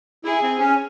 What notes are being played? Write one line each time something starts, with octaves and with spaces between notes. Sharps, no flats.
E4 G#4
C4
C#4